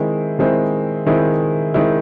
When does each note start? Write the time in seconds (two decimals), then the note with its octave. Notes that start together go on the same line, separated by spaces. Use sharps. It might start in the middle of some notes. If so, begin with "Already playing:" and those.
Already playing: D#3 G#3 C4 E4
0.39 D#3 G#3 C4 E4
1.06 D#3 G#3 C4 E4
1.74 D#3 G#3 C4 E4